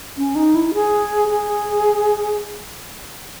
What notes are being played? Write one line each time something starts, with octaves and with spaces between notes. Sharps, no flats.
C#4
D#4
E4
G#4
G#4